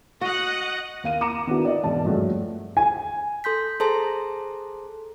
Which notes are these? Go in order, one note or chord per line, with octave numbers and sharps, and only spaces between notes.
F#4 D#5 F#5
D#2 F5 D#7
A#5 D6 C#7 D#7 E7
D#3 B3 D4 E4 F#4
D5 D#5
E1 G#2 D5 A5
G2 F3 F#3 G#3 A3
G#5
A4 C6 G6 B6
G#4 A4 C5 A5 A#5 C6